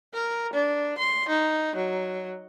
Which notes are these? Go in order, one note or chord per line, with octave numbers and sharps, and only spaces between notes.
A#4
D4
C6
D#4
F#3